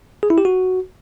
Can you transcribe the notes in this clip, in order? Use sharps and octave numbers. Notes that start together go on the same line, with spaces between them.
G#4
E4
G4
F#4